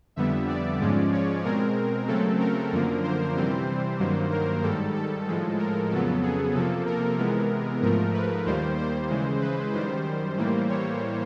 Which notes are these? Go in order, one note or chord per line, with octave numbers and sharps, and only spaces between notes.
F2 D3 G3 B3 E5
D5
G#2 F3 G#3 C#4
C#5
B2 G#3 C4 A#4
C#3 F#3 A3 C4 A4
A#4
F#2 D3 F3 A#3
C5
C3 E3 G3 C4 C5
G2 D#3 F#3 A#3
A#4
G#2 D#3 G3 A4
A4
A2 F3 G#3 A4
A#4
F2 C#3 F#3 B3 A4
G#4
C3 F3 A#3 A4
A#4
C3 E3 G#3 B3
G#2 F3 A3 A#4
B4
D#2 D#3 G3 A#3 C5
C5
C#3 E3 G#3
B4
F#2 D#3 G3 C5
A2 E3 G3 A#3
C#5